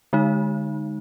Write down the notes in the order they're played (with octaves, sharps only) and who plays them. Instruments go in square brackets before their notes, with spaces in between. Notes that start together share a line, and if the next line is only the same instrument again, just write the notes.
[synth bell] D3 G#3 D#4